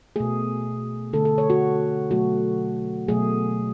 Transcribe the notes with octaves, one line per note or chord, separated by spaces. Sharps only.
B2 A3 G#4
D3 A3 A4
A4
C#5
F#4
B2 F#3 A3 F#4
B2 F#3 A3 G#4